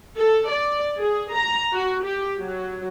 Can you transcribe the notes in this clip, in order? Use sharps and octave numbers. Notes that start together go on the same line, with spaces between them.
A4
D5
G#4
A#5
F#4
G4
F#3